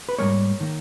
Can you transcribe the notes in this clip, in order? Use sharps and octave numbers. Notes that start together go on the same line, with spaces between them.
B4
G#2 G3 A#3 A#4 C#5
D#3 A#3